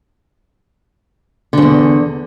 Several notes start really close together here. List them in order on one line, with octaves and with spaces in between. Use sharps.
D3 G#2 E2